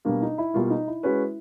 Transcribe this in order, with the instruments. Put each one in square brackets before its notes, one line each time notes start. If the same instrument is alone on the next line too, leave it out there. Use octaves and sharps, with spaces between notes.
[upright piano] B2 G3 A#3 [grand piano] D4
[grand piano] D#4
E4
[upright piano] B2 G3 A#3 [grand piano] F4
[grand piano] D#4
E4
[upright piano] G#3 C#4 F#4 B4